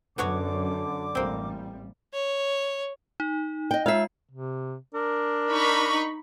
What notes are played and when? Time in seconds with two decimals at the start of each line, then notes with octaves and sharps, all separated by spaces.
0.18 F#2 D3 B3 F#4 C#5 D6
1.15 A1 G3 A#3 C4
2.14 C#5
3.20 D#4
3.71 D#5 G5
3.86 G#3 F4 E5 F5 C7
4.31 C3
4.94 D4 A#4
5.49 D#4 B5 C#6